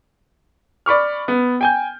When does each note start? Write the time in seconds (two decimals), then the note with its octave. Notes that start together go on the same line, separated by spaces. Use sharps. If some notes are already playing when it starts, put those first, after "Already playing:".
0.86 D5 B5 C#6 F6
1.28 B3
1.61 G5 G#5 G6